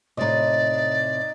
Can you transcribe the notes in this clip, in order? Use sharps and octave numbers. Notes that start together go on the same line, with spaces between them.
A2 C3 D#4 D5 D#5